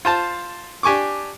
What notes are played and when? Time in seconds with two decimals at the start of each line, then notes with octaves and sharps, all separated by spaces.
0.05 F4 C5 A5
0.83 D4 G4 G#5 C#6 D6